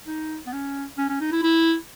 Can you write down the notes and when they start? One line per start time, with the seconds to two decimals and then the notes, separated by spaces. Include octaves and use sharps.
0.07 D#4
0.46 B3
0.53 C#4
0.98 C#4
1.09 C#4
1.20 D#4
1.32 E4
1.43 E4